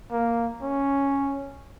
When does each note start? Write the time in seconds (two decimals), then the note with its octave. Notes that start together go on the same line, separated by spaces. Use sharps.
0.12 A#3
0.62 C#4